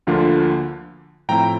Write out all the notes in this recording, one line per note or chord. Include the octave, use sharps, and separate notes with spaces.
D2 D3 F3 A#3 F4
A2 F3 C4 E4 G5 A#5